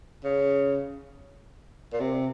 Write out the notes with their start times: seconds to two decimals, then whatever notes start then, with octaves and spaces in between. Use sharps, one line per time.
0.24 C#3
1.93 A#2
2.00 C3